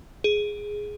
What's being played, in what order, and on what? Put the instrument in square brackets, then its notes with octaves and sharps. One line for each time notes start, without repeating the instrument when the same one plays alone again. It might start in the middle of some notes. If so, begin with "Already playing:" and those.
[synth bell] G#4